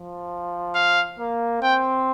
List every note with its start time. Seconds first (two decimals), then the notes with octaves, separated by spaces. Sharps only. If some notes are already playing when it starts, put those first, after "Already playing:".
Already playing: F3
0.75 F5
1.19 A#3
1.63 C4 G5